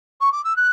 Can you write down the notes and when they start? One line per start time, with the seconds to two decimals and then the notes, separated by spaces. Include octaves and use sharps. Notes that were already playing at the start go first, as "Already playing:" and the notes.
0.21 C#6
0.32 D6
0.44 E6
0.56 F#6